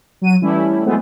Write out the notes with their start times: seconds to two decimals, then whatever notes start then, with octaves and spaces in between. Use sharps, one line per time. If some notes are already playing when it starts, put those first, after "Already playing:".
0.21 F#3 D#7
0.42 E3 G3 A3 C#4 E4
0.85 E3 F#3 G#3 A3 B3 C4